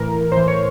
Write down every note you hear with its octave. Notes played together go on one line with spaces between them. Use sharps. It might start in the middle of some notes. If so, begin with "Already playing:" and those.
Already playing: A2 E3 A#4
A2 E3 C5
C#5